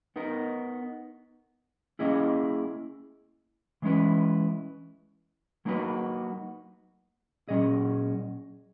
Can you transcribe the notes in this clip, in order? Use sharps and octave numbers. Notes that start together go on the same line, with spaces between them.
B3 D#4 A#4
A#3 C#4 E4 G#4 D#5
E3 G#3 C#4 E4 B4
F#3 A#3 D#4 F#4 B4
A#2 F#3 C#4 G#4 D#5